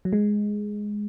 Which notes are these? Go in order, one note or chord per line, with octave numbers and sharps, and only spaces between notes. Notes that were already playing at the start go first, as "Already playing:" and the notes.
F#3
G#3